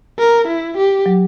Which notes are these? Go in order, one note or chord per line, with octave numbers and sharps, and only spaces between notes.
A#4
E4
G4
F#3